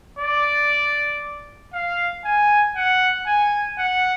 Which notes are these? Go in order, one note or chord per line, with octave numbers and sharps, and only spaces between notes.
D5
F5
G#5
F#5
G#5
F#5